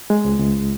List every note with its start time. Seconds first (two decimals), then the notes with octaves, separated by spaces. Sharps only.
0.10 G#3
0.25 C#2
0.39 C#2